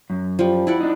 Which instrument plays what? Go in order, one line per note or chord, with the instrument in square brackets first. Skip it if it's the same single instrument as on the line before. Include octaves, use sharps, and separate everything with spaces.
[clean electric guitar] F#2
[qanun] F3 G3
E4 D5 F#5
[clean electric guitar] D4 D#4